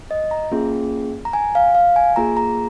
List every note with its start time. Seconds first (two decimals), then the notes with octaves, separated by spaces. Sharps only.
0.11 D#5
0.31 A#5
0.52 A#3 C#4 F4 G#4
1.25 A#5
1.33 G#5
1.55 F5
1.75 F5
1.96 G#5
2.16 A#3 F4 G#4 A#5
2.37 A#5